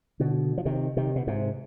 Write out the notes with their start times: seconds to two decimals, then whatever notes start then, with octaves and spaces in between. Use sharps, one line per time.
0.20 B2 D3
0.58 F3
0.65 C3 D#3
0.97 C3 D#3
1.16 B2
1.27 G#2 C3